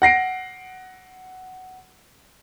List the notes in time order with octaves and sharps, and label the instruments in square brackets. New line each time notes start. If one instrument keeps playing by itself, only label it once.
[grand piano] F#5 A#6 C7 D7